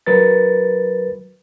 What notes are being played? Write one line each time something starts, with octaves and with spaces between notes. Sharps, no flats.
F#3 A#4 B4 A6